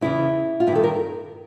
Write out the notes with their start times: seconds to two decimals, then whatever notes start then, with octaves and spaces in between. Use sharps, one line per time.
0.01 E2 C#3 E3 E4
0.60 F4
0.67 G2 E4
0.72 D#3 A4
0.84 A#4